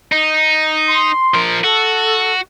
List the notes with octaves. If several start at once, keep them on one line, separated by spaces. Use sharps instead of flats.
D#4
C6
F3 A#4
F#4 A4